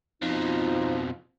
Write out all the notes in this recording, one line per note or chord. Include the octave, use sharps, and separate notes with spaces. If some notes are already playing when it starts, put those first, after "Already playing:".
F2 B2 F3 D#4